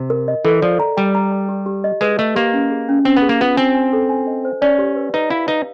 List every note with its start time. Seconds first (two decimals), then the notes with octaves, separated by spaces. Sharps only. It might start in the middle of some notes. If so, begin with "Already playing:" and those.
Already playing: C3
0.10 A#4
0.28 D#5
0.45 E3 A4
0.62 F3 D5
0.80 A#5
0.97 G3 G5
1.15 A#5
1.32 A#5
1.49 G4
1.66 G4
1.84 D#5
2.01 G#3 B4
2.18 A3 D#5
2.36 A#3 G4
2.53 C#4
2.70 G#4
2.89 C#4
3.05 C4 C#4
3.17 B3
3.22 G#4
3.29 A#3
3.40 B3 F4
3.57 C4 G#5
3.74 G#5
3.93 A4
4.09 G#5
4.27 D#5
4.45 C5
4.62 C#4 D5
4.79 G4
4.96 B4
5.14 D#4 B4
5.30 E4 F5
5.48 D#4 B4